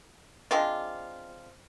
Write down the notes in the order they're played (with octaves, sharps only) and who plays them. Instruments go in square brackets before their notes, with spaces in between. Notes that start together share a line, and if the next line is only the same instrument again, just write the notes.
[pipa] G#3 C4 D4 F4